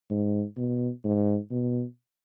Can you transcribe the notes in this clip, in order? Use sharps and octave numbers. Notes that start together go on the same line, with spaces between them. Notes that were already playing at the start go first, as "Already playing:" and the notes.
G#2
B2
G#2
B2